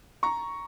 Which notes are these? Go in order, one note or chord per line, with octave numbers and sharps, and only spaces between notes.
A#5 C#6